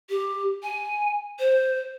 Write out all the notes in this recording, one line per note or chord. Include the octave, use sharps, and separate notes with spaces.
G4
G#5
C5